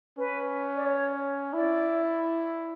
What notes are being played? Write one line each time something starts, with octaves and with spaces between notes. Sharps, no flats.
C#4 B4
D5
C#5
E4 D5